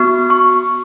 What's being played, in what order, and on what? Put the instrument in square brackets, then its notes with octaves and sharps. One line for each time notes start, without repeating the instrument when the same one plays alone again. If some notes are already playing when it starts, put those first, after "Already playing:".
Already playing: [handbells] B3 F#4
C#6